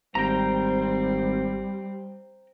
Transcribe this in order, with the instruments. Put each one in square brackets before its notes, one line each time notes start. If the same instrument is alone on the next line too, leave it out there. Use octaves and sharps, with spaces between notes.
[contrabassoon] G#1 [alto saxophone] G3 [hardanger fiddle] C4 [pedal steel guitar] G5 A#5